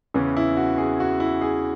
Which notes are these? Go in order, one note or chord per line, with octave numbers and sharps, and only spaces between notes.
E2 C#3 E3 C#4
E4
F#4
G#4
F#4
E4
G#4